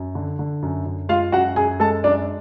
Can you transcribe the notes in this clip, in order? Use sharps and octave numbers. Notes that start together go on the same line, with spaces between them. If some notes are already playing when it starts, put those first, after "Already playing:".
Already playing: F#2
D3
D3
F#2
F#2
G#3 F4 F5
F#2 F#4 F#5
F#2 G#4 G#5
G#3 A4 A5
F#2 D4 D5